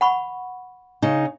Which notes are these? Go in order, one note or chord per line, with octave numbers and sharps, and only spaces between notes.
F#5 B5 C#6
C#3 D#4